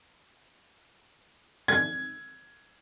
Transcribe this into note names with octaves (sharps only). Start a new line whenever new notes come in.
G#6